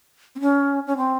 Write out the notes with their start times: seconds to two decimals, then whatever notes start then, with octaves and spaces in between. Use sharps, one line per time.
0.36 C4
0.40 C#4
0.87 C#4
0.97 C4